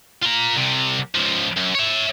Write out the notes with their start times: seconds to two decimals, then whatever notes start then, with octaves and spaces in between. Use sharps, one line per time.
0.22 F4 A#5
0.55 C2 C3
1.14 C#2 F3
1.57 F#2
1.75 C#5 E5